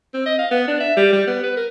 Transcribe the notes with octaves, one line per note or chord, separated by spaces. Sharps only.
C4
D#5
F5
B3
D4
E5
G3
G3
B3
B4
A#4